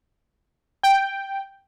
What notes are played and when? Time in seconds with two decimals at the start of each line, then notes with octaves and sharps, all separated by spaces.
0.83 G5